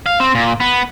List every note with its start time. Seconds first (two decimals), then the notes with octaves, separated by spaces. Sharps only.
0.06 F5
0.20 C4
0.35 A#2
0.60 B3